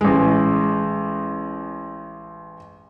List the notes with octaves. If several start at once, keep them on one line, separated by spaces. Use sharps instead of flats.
A1 G#3